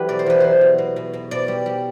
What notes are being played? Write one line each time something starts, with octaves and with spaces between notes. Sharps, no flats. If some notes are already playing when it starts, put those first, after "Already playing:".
Already playing: E2 F#3 G3 G4 A4 B4
B2 D5
C5
E2 B4
F#3 C5
B2
B2
B2
B2
B2 D5
G3
G3